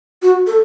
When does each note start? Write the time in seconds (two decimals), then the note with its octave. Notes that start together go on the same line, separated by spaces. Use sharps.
0.22 F#4
0.47 A4